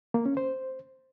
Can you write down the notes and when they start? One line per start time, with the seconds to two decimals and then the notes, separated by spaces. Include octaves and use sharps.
0.14 A#3
0.26 C#4
0.37 C5